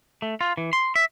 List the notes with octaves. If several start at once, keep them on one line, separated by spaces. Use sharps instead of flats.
A3
F4
E3
C6
E5